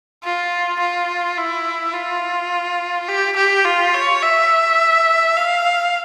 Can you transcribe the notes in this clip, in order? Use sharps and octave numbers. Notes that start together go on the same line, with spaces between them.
F4
F4
E4
F4
G4
G4
F4
C#5
E5
F5